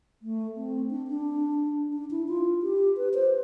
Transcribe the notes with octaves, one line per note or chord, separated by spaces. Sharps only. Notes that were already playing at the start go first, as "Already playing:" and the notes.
A3
C4
D4
D4
D4
E4
F4
G4
B4
C5